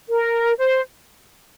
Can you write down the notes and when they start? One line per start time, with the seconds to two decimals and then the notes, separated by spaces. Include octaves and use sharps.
0.09 A#4
0.58 C5